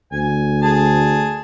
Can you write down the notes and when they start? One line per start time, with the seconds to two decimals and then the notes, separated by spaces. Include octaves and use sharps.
0.12 D2 G#5
0.62 G#4 A5